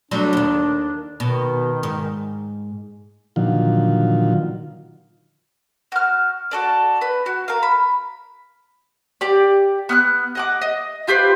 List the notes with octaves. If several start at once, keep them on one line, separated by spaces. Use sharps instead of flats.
F#3 G3 A3 D4
D#2 D#3
B2 D#3
G#2
A#2 D3 D#3 F3 F#3 F4
F#4 F6
F#4 A4 D5
B4
F#4
A#4 F5
B5
G4 D5
B3 F6 F#6
D#5 F#5 D6
D#5
F4 G4 B4 C5